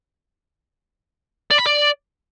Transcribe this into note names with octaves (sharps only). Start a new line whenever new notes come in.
D5
B5
D5